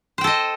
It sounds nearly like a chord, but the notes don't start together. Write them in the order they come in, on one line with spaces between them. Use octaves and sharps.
C5 G5 A4 D#5